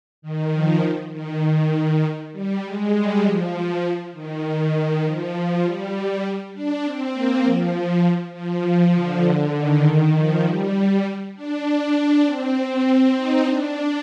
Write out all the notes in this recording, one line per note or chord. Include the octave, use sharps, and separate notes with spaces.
D#3
F3
D#3
D#3
G3
G#3
G3
F3
D#3
D#3
F3
F3
G3
D4
C4
A#3
F3
F3
D3
D3
D#3
F3
G3
D4
D4
C4
C4
D#4
D4